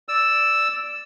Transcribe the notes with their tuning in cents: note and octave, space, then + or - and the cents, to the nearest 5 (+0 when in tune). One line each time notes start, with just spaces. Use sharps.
D5 +0 E6 +0